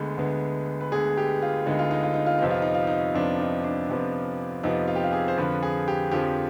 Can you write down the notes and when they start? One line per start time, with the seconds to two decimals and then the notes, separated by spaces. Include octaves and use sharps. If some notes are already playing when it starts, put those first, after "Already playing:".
Already playing: D2 D3 G#3 B3 B4
0.17 D2 D3 G#3 B3
0.81 B4
0.92 D2 D3 G#3 B3 G#4
1.17 G4
1.42 F4
1.66 D2 D3 G#3 B3 D#4
1.79 F4
1.91 D#4
2.03 F4
2.14 D#4
2.26 F4
2.39 F2 C3 F3 B3 D#4
2.51 F4
2.62 D#4
2.75 F4
2.87 D#4
3.14 F2 C3 F3 B3 D4
3.40 D#4
3.64 D4
3.89 F2 C3 F3 B3
4.63 F2 C3 F3 B3 D#4
4.88 F4
4.96 G4
5.04 F4
5.13 G#4
5.28 C5
5.38 F2 D3 F3 B4
5.63 G#4
5.88 G4
6.11 F2 D3 F3 G4